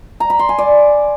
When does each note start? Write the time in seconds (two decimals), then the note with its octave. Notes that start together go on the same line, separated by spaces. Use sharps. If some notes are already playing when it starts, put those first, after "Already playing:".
0.20 A#5
0.30 B5
0.39 C6
0.49 G#5
0.58 D5